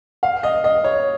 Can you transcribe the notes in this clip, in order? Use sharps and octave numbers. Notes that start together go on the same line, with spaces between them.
F5
D#5
D#5
C#5